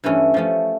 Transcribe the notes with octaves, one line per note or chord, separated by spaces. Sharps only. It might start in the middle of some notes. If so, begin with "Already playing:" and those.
G2 E3 A3 C#4
F3 A3 C#4